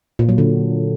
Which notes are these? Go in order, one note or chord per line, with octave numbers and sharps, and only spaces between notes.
A#2
F#3
D3